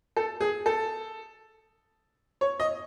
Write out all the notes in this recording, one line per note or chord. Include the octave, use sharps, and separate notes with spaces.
A4
G#4
A4
C#5
D#5